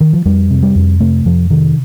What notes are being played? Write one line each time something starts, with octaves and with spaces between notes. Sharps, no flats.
D#3
F3
F2 G3
C3
G3
F2
C3 A3
F2 F3
C3 D#3